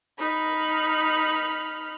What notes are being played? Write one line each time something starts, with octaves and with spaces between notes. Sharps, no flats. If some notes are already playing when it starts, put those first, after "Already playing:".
D#4 B5 F6